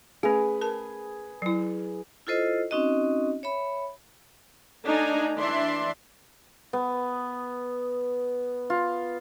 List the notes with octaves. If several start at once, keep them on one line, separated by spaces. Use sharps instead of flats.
A3 C#4 G#4 B4
A#4 A5
F#3 E4
E4 F4 A4 C5 D#5
C4 C#4 D#4 F#4 D#5
C#5 E5 B5
A3 D4 D#4 G#5 A#5
E3 D4 D5 E5 C6
B3
F4